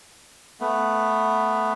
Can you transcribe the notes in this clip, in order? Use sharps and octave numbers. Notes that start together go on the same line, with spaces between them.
A3 B3